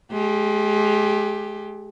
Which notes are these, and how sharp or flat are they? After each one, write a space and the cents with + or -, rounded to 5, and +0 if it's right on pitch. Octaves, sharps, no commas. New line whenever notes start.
G#3 +35 G4 +5